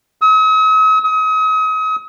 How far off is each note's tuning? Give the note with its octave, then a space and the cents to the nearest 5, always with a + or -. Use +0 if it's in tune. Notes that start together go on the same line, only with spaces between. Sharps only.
D#6 +45
D#6 +35